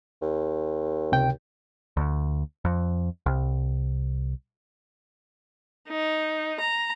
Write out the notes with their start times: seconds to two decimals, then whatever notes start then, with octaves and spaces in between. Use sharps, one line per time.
0.22 D#2
1.12 C#2 C3 G5
1.97 D2
2.65 F2
3.26 C2
5.89 D#4
6.61 A#5